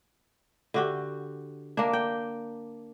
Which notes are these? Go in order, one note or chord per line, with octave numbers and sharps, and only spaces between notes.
D3 F#4 G4
A#3 D4
G5